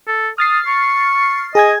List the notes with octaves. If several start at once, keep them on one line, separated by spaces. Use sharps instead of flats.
A4
D#6 F6 A6 C7
C#6
G#4 D#5 G#5 G#6